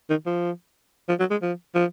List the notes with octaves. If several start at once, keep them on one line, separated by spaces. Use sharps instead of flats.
D#3
F3
F3
F#3
G#3
F3
F3